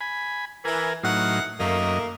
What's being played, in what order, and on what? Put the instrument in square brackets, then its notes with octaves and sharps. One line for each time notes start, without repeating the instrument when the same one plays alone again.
[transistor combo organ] G#5 B5
[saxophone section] E3 [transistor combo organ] A#4 G#5
[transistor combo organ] A2 F#3 D#4 [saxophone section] E3 F5 F#5
[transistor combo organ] F#2 D#5 [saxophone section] D#3 A3 A#3